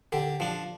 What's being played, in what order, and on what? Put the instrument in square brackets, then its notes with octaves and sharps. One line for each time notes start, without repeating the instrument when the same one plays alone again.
[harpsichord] D3 G4
F3 D4